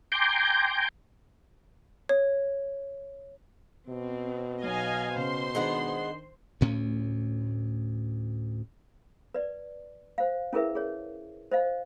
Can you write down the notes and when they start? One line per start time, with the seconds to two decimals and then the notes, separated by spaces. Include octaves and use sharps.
0.12 G5 G#5 A#5 C6 D6 G6
2.09 C#5
3.89 B2 C4
4.63 B1 C#5 D#5 F5 G#5
5.16 C#3 C5 C6
5.55 D#3 G#3 B3 D4 F#5
6.61 D2 A2 C#4
9.34 B4 D5
10.18 C5 F5
10.53 C#4 E4 G#4 A#4 B4 E5
10.75 G#4 C#5
11.51 C5 D#5 F5